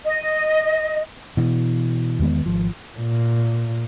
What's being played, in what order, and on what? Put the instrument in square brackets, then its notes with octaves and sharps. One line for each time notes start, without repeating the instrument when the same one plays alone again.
[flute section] D#5
[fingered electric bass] B2 E3
E2 D#3 G#3 B3
G#1 F3
[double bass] A#2